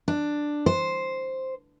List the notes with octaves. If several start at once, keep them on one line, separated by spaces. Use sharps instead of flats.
D4
C5